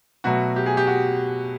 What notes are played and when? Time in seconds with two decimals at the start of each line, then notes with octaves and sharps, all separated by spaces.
0.24 B2 F#3 A3 F#4
0.56 G4
0.66 G#4
0.77 G4
0.87 F#4